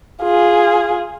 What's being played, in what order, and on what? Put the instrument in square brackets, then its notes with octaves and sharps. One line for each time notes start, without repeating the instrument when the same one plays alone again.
[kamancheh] F4 G#4